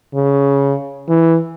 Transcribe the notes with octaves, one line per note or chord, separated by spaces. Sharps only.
C#3
E3